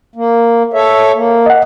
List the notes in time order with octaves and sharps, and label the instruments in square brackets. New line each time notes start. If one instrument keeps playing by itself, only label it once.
[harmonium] A#3
A4 C#5 E5
A#3
[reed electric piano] D#5 F#5